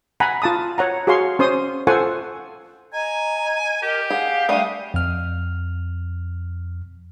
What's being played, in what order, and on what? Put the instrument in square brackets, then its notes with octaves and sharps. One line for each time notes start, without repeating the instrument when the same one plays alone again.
[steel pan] F#5 G#5 A#5 B5
F4 A5 D#6
C#5 F#5 A#5
F#4 G#4 C#5 F5 C6 C#6
C#4 C5 C6 D#6
F4 A4 C5 F#5 G#5 C#6
[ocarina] D#5 [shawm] G#5 [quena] A#5
[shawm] G4 [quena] A#4
[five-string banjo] G#4 [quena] F5 [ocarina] F#5
[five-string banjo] G3 A3 D4 [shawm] D#6
[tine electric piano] F2 F6